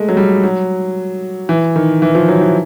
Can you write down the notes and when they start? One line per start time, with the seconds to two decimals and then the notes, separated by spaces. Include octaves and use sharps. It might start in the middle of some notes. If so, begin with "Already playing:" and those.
Already playing: G#3 A3
0.09 F#3
0.17 G3
0.43 F#3
1.49 E3
1.76 D#3
2.02 E3
2.15 F3
2.29 F#3
2.41 E3